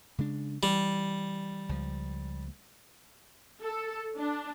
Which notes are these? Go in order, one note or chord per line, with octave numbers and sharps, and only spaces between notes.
C#3 G#3 D4
E3 G3
C#2 F3
A4
D4